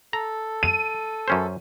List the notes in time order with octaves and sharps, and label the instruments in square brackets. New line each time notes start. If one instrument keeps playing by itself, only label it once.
[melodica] A4 [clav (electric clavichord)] A#5
[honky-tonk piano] D#7
[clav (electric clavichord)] F#2 C#4 C5